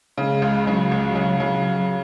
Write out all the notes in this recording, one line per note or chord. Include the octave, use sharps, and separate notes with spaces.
C#3 G#3
C#2
C#3 F#3
C#2
C#3
C#3